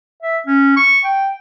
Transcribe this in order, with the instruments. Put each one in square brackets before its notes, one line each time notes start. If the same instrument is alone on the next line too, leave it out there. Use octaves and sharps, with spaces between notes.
[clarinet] E5
C#4
C#6
G5